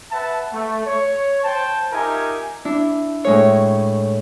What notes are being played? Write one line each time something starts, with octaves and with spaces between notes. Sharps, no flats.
B4 E5 F#5 A5
A3
C#5
C5 G5 A5
D#4 F4 G4 A#4 E5 G#5
D4 E4
A2 G#3 C#5